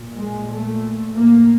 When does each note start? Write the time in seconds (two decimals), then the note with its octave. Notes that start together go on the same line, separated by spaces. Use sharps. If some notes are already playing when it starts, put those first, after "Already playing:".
Already playing: A#2
0.15 G#3
0.48 A3
1.16 A#3